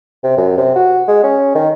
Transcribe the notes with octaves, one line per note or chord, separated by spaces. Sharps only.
C3
F#2
C3
F#4
G#3
C#4
D#3